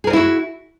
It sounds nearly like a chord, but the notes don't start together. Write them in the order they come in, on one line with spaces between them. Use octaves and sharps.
G#4 A#4 D#5 E4 F#4